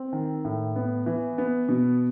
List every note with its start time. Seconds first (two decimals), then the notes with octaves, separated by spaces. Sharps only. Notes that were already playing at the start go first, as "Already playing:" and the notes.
Already playing: C4
0.13 D#3
0.45 A2
0.76 B3
1.06 E3
1.38 B3
1.69 B2